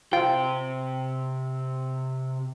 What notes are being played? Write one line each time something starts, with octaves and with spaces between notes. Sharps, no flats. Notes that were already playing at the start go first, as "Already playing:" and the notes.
C3 F4 C5 G5